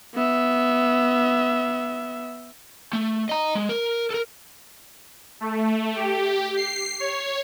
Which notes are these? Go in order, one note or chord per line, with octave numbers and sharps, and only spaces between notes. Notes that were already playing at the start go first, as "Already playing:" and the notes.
B3 E5
A3
D#5 A#5
G#3
A#4
A4 A#4
A3
G4
C7
C#5